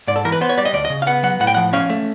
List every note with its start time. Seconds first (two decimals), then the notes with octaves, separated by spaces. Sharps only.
0.07 G#2 D5
0.16 A4
0.25 E3 A#4
0.32 B4
0.41 B3 C5
0.49 C#5
0.58 G3 D5
0.65 D#5
0.73 D2 D5
0.85 D#5
0.90 C#3
1.02 F5
1.07 B3 F#5
1.23 F#3 F#5
1.40 A2 F#5
1.47 G5
1.54 F3 F#5
1.73 C#4 F5
1.89 A3